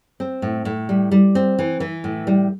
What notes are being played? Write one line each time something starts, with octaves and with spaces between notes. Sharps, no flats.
C4
A2
A2
G3
G3
C4
E3
E3
A2
G3